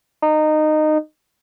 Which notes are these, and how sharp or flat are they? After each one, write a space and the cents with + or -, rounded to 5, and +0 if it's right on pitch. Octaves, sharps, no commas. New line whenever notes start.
D#4 -20